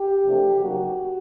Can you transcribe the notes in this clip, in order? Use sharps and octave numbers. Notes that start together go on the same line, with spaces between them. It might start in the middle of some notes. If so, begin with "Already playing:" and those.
Already playing: G4
E2 C3 F3 A3 D4
C#3 F#3 A#3 D#4 F#4